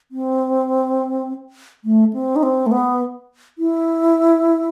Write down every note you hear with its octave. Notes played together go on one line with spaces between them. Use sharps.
C4
A3
C4
D#4
C4
A3
B3
E4